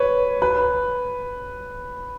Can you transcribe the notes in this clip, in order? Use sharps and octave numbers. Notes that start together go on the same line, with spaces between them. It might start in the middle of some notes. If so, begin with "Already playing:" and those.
Already playing: B4 C#5
B4